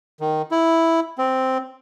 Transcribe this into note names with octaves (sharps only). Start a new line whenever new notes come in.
D#3
E4
C4